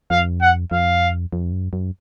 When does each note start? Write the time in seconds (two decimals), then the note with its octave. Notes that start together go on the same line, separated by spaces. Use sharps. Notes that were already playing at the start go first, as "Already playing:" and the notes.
0.10 F2 F5
0.41 F#5
0.71 F2 F5
1.33 F2
1.52 F#2
1.73 F#2